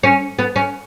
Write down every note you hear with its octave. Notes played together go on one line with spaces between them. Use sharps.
C#4
B3
C#4